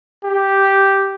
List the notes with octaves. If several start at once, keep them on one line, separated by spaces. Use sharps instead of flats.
G4